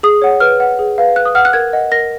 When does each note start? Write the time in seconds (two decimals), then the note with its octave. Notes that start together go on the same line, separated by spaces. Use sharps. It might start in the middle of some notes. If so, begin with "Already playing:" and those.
0.03 G#4 D#6
0.22 C#5 F#5
0.40 B4 F6
0.60 F#5
0.79 G#4
0.98 B4 F5
1.16 B4 F#6
1.25 D#6
1.35 F#5 F6
1.45 F#6
1.53 A#4 G#6
1.73 D#5 F#5
1.91 A#4 A#6